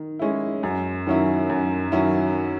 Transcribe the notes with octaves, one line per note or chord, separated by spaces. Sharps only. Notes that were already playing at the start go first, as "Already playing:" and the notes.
Already playing: D#3
G#3 C#4 E4
F#2
D#3 F#3 C#4 E4
F#2
D#3 F#3 C#4 E4